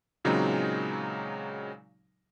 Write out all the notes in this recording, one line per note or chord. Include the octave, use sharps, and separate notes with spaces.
A#2 C#3 F#3 G#3 C4 D#4